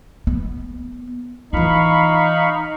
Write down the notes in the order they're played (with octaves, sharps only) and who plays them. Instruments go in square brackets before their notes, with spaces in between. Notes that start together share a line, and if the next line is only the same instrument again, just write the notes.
[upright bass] B3
[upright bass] E3 F4 [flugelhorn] D#4 [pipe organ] F5 B5 C#6